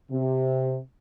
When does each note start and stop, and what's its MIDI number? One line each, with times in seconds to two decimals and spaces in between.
0.11 0.76 48